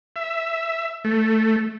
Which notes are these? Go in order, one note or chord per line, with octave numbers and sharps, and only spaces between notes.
E5
A3